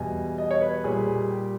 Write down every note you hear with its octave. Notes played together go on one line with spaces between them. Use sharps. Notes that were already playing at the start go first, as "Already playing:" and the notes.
Already playing: E2 B2 G3 G#5
D#5
C#5
B4
A#2 G3 G#4
G4